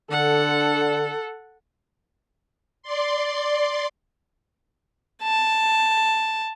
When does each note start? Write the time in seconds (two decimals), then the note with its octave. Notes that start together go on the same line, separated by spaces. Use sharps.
0.10 D3 A4 F#5
2.82 D5 C6
5.22 A5